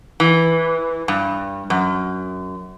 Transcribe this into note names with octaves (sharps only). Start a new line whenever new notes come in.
E3
G2
F#2